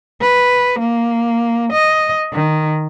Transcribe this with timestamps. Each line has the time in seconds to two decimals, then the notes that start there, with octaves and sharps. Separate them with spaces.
0.21 B4
0.80 A#3
1.73 D#5
2.33 D#3